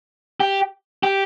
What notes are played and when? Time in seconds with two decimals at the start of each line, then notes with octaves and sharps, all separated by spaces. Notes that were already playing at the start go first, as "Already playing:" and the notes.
0.40 G4
1.03 G4